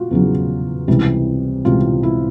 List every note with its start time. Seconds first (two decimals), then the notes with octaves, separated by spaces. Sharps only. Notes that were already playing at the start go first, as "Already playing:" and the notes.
Already playing: F4 F#4
0.11 E2 C#3 F#3
0.88 C#2 C3 E3 G3
1.65 C#2 C3 E3 G3 F4
2.03 E4